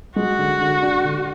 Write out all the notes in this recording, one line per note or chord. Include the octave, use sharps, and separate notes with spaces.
G#3 F#4
D3
D3
D4
D3